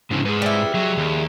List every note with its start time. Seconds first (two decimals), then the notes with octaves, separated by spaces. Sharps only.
0.11 G#2 C#3 G#3 D4 E4
0.25 G#2 G#4 B4
0.42 G3 E4
0.74 F#3 G#4 D#5 E5
0.98 D#2